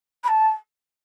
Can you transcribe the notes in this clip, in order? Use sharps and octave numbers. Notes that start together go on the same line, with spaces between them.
B5
A5